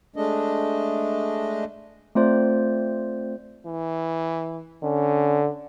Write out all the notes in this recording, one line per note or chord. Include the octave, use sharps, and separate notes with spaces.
G#3 A3 D4 D#5
A3 C4 F4 C5 D5
E3
D3 C#4